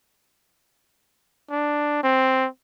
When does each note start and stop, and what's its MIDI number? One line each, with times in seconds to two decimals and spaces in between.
1.50 2.01 62
2.03 2.47 60